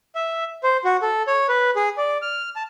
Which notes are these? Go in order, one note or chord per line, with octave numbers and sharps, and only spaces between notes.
E5
C5
F#4
A4
C#5
B4
G#4
D5
F6
A5